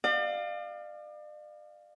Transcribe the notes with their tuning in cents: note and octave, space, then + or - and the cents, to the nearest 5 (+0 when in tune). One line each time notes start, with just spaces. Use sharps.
D5 +40 F5 +0